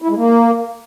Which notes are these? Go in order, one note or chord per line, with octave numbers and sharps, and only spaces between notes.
E4
G#3
A#3